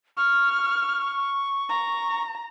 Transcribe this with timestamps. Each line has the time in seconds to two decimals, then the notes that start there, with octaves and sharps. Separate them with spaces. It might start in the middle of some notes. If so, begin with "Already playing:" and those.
0.17 C#6 F6
1.69 A#5